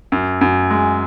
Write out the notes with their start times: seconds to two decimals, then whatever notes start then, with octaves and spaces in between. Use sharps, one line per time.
0.12 F#2
0.41 F#2
0.70 G#3